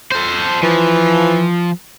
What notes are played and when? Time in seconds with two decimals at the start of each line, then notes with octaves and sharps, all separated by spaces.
0.12 A4 C5
0.63 E3 F3